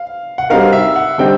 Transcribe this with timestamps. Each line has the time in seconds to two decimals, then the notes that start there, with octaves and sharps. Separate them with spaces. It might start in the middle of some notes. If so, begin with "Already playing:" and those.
Already playing: F5
0.38 F#5
0.50 G3 C4 D#4 F#4 A#4 F5
0.73 E5
0.96 F#5
1.18 D3 G3 C4 D#4 G5